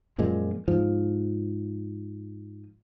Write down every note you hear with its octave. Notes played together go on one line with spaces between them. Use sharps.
F#2 A#2 F3 G#3
G#2 F3